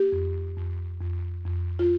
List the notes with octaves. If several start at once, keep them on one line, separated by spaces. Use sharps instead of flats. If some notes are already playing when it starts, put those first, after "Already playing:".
Already playing: A#3 G4
F2
F2
F2
F2
F4